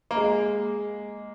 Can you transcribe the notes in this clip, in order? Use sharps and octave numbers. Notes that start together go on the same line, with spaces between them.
A#3
G#3